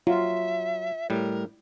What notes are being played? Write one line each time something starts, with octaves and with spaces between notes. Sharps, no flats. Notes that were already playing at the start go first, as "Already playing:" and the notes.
F#3 F4 E5
A2 G3 A#4